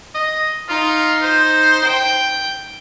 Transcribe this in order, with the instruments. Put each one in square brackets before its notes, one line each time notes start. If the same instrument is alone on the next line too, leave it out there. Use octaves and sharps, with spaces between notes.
[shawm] D#5
[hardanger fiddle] D#4 [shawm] F4
[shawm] C5
[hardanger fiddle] G5